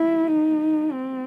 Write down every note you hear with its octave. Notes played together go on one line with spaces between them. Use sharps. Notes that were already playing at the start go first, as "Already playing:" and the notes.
Already playing: E4
D#4
C4